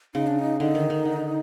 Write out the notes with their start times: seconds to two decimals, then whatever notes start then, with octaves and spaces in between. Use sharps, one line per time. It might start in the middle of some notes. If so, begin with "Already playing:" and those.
0.14 C#3 D#4
0.27 D4
0.39 D#4
0.60 D3 D#4
0.75 D#3
0.90 D#3
1.05 D3